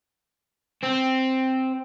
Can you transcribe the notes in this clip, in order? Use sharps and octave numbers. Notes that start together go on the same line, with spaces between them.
C4